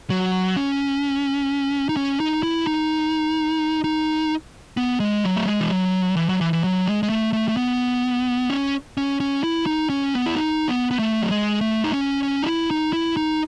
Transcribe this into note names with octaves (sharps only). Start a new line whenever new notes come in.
F#3
C#4
D#4
C#4
D#4
E4
D#4
D#4
B3
G#3
F#3
A3
G#3
E3
F#3
E3
F#3
E3
E3
F#3
G#3
G#3
A3
A3
A3
B3
C#4
C#4
C#4
E4
D#4
C#4
B3
E4
D#4
B3
B3
A3
F#3
G#3
A3
D#4
C#4
C#4
D#4
E4
D#4
E4
D#4